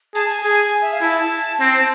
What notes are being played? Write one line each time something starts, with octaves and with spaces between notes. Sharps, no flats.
G#4 A5
G#5
G#4 G#5
E5
F5
E4 A5
C4 A5